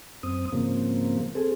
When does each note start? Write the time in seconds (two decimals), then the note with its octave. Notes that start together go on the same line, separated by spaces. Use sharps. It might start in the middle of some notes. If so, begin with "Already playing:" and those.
0.23 F#2 C4 D#6
0.52 G#2 C#3 F3 A#3 C4
1.35 C4 G#4 A4